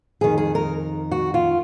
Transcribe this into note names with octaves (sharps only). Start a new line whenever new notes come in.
F2 D#3 G#4
G#4
A#4
F#4
F4